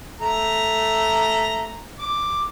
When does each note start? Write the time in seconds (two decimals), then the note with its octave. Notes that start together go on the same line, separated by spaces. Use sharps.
0.21 A3 A#5
1.99 D6